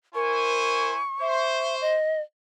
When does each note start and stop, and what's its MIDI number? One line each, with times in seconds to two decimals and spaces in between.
0.15 1.01 64
0.15 0.91 70
0.15 1.01 72
0.15 1.01 80
0.15 1.81 85
1.21 1.97 72
1.21 1.76 76
1.81 2.20 75